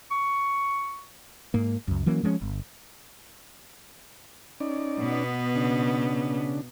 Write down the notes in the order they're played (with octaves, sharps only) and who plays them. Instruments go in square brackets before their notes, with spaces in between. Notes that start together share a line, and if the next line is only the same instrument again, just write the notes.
[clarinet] C#6
[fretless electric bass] G#2 A#3
C#2 F#2
E3 F#3 A#3 C#4
F3 G#3 A#3 C#4
G1
[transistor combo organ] C#4 D#4 D5
[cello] B2 B3
[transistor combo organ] C#3 D4